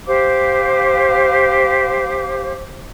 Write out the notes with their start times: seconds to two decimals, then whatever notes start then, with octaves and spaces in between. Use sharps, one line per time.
0.06 G4 C5 F5 D6